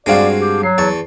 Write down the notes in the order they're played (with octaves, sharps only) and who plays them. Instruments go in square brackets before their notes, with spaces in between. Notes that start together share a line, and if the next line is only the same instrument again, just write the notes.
[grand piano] G2 F5 [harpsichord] G#3 C4 F#4 [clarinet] D5
[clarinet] G4
[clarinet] F#3 [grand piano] C7
[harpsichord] E2 A5 C#6